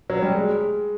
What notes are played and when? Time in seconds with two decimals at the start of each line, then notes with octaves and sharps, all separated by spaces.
0.10 F#3
0.22 G3
0.35 G#3